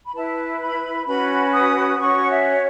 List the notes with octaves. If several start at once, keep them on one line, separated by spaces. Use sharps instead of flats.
B5
E4 B4 A5
B5
C#4 F#4 B4 B5
D#6
C#4 F#4 C#5 C#6
F#5
E5